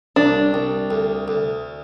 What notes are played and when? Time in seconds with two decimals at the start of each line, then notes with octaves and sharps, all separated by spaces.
0.16 C2 D4
0.54 C2
0.91 D2
1.28 D2